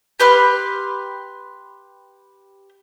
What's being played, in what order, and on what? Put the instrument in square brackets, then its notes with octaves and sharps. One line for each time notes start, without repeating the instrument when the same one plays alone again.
[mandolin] G4 B4 C6 F6